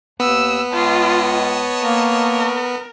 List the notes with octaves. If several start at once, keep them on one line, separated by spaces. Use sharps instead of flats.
D#2 B3 E6
C#2 F4 C#5 D#5 A5
A#3 A#4